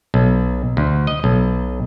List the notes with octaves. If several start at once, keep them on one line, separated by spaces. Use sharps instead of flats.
B1
D2
D#5
B1